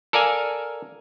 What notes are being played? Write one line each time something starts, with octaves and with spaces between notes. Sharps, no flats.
A4 A#4 D5 F5 G#5